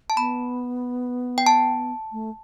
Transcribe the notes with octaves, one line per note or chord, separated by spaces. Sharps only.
A5
B3 B5
G5
A5
A3